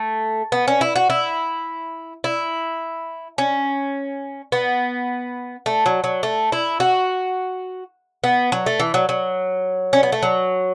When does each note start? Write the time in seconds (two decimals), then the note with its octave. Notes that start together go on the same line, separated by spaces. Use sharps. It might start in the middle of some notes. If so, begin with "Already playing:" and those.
Already playing: A3
0.52 B3
0.68 C#4
0.81 E4
0.96 F#4
1.10 E4
2.24 E4
3.38 C#4
4.52 B3
5.66 A3
5.86 F#3
6.04 F#3
6.23 A3
6.52 E4
6.80 F#4
8.24 B3
8.52 F#3
8.66 A3
8.79 E3
8.94 F#3
9.09 F#3
9.93 C#4
10.03 B3
10.12 A3
10.23 F#3